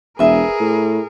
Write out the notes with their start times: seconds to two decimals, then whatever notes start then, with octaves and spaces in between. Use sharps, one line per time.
0.19 E1 G#4 A#4 B4 E5
0.60 A2